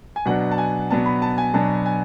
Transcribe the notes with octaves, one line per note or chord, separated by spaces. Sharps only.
G#5
B2 F#3 B3 D4 F#5
A5
G#5
B2 F#3 B3 D4 A5
B5
A5
G#5
B2 F#3 B3 D4 A5
G#5